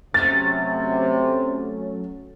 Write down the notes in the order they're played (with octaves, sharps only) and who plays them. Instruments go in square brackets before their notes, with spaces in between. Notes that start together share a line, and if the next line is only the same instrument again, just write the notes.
[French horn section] C3 [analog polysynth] F#3 A3 C#4 [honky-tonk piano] A6